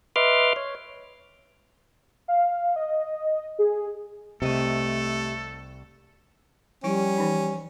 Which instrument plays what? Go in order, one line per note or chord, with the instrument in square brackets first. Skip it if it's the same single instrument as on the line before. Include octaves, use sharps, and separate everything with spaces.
[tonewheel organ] B4 D#5 E5 C6 D6 F6
C#5
[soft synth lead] F5
D#5
G#4
[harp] C2 D#5 D#7 [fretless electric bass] C3 [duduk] A3 [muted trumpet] A4
[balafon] F3 E4 [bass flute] G3 [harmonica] C#4
[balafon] E3 D#4